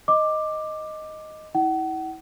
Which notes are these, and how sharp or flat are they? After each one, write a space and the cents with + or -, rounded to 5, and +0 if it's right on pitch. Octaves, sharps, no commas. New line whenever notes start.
D#5 +0 D6 +10
E4 -35 F#5 +35